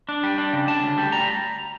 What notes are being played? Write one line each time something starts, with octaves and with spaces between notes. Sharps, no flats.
D4
G3
D4
C#3
D4 A5
D2
G3
G3 A#5